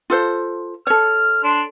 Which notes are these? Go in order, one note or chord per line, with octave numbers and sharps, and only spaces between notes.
F4 A4 C5
A4 C#5 F6
D4 C6